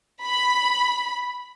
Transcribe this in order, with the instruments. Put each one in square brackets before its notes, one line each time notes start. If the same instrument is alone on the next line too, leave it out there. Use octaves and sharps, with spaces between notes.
[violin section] B5